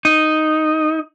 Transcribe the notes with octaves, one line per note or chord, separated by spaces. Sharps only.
D#4